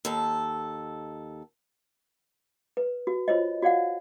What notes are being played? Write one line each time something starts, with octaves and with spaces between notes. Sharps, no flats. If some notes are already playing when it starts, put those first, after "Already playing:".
D#2 A4
B4
F#4
F4 C5 C#5 D#5
F#4 D5 F5 F#5